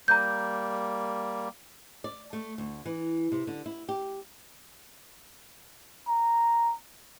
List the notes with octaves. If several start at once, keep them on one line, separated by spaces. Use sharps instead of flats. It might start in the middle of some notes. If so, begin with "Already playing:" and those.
G3 A#3 A#5 G6
D5
A3
D2
E3
C3
D3
E4
G4
A#5